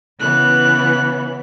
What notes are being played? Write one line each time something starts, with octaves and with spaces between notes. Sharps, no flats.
C#3 E3 B3 F#6